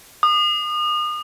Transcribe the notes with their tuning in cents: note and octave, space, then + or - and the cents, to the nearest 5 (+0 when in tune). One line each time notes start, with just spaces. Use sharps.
D#6 -35